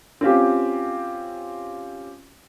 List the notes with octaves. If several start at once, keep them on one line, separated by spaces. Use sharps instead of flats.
C4 C#4 F4 G4